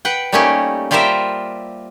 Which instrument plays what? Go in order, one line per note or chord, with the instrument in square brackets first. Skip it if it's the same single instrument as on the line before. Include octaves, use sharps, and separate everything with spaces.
[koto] B4 F#5 G5
G3 A3 A#3 C#4 D#4 G4
G3 F4 G4 A#4 C5 E5